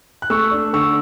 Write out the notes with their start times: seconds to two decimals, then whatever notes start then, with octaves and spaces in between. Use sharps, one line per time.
0.22 F#6
0.30 A3 C#6 E6
0.52 D4
0.73 D3 C#6 E6